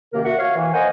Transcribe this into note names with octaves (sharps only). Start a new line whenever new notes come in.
F#2 C3 D#3 A#3 A#4
F#4 E5 F#5
C#5 F5
E3
A#3 C5 D#5 F#5 G#5